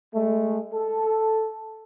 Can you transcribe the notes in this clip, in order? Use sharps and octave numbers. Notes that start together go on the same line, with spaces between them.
G#3 A3
A4